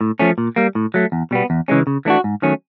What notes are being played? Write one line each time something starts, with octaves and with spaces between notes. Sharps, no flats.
A2
F3 A3 C#4
A#2
G3 A#3
A2
F#3 A3
E2
B2 G3 B3
E2
C#3 E3 G#3 C#4
C#3
E3 A3 D4 F#4
G#2
D#3 F#3 A3 C#4